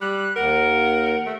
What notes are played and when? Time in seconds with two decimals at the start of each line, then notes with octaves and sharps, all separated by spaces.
0.01 G3 F#6
0.36 D#2 A#4 F#5 A#5
1.26 A3